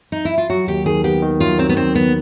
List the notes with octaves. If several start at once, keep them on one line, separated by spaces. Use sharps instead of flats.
D#4
E4
F4
F#3 F#4
D#2 G4
D#3 G#4
B3 G4
D#3
F#3 F4
F#3 C4
B3
D#3 C4
D#2 B3